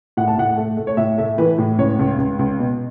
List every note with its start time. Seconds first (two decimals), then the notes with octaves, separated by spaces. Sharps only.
0.17 A2 F#5
0.27 A5
0.38 A2 F#5
0.57 A3
0.77 A3
0.87 C#5
0.97 A2 E5
1.18 A3 E5
1.38 E3 B4
1.58 A2
1.78 C#2 C#5
1.99 C#2
2.18 C#2
2.39 C#2
2.59 B2